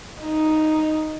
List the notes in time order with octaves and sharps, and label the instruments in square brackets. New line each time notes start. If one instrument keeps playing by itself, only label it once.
[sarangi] D#4